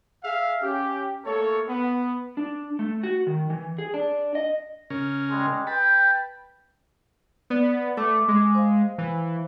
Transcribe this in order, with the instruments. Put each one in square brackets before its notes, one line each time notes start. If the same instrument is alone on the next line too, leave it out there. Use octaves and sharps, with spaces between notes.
[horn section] G#4 E5 F5
C#4 G4
A3 A#3 A4 C#5
B3
[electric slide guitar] D4
A3
F#4
D#3
E3
G#4
D4
D#5
[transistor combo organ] C#3 C#4 A#4
[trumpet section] G3 G#3
[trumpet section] B4 G5 [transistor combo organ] A5 B5
[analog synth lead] B3 [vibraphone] D5
[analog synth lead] A3 [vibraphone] D6
[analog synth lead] G#3
[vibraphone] C5 F5
[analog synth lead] E3